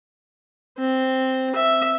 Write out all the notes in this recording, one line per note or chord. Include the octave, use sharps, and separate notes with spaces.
C4
E5